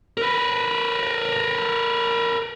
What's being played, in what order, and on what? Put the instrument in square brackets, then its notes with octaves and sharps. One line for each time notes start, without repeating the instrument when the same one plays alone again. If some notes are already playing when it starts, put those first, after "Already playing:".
[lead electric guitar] A#4 B4